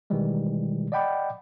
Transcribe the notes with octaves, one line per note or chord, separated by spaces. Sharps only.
B2 D#3 E3 G3 G#3
D5 D#5 F#5 G5 B5 D6